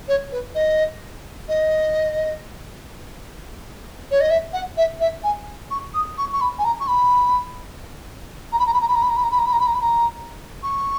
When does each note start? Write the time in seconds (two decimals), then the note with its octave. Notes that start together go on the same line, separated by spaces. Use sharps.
0.08 C#5
0.32 B4
0.55 D#5
1.48 D#5
4.11 C#5
4.20 D#5
4.30 E5
4.53 F#5
4.77 E5
5.00 E5
5.23 G#5
5.70 C#6
5.94 D#6
6.18 C#6
6.33 C#6
6.41 B5
6.58 G#5
6.64 A#5
6.80 C#6
6.88 B5
8.52 A#5
8.59 B5
8.66 A#5
8.73 B5
8.81 A#5
8.88 B5
8.95 A#5
9.02 B5
9.09 A#5
9.16 B5
9.23 A#5
9.31 B5
9.38 A#5
9.45 B5
9.52 A#5
9.60 B5
9.67 A#5
9.74 B5
9.81 A#5
10.63 C#6